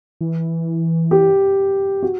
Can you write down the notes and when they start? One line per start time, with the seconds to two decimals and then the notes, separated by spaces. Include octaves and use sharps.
0.21 E3
1.11 G4
2.03 F#4